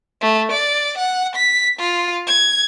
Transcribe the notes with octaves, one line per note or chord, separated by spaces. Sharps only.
A3
D5
F#5
B6
F4
G#6